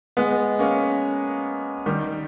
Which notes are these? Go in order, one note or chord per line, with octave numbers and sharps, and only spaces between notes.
G#3 B3
A#3 C#4
D#3 G3